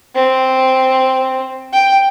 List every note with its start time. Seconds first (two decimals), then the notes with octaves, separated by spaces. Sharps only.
0.15 C4
1.73 G5